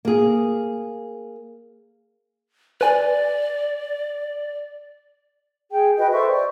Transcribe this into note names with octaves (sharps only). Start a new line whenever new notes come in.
A#3 G#4
B4 D5 G#5
G#4 G5
F#4 B4 D#5 G5
A4 C5 E5 C#6
D5